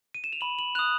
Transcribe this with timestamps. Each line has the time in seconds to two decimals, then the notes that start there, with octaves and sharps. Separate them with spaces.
0.14 D#7
0.24 E7
0.33 F7
0.41 B5 F#7
0.59 F#7
0.75 F#6 F7
0.79 D#6